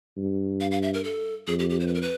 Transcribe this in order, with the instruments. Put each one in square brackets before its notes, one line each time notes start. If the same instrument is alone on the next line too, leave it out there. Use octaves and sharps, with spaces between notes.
[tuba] G2
[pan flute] F5
F5
E5
A#4
A4
[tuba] F2 [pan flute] G#4
[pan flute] G4
G4
C5
B4
A#4
B4